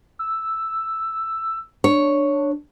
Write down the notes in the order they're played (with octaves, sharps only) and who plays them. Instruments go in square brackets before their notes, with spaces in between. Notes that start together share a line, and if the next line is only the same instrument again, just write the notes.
[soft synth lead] E6
[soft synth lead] D4 [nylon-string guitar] C#5